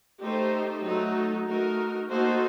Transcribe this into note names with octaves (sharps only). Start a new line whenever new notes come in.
A3 D#4 G4 C5
F#3 A3 D#4
A3 D#4 F#4 A#4
A#3 D#4 F#4 A4 C5